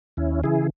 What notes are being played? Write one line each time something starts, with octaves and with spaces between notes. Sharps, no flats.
D#2 C#4 E4
C#3 E3 E4 G#4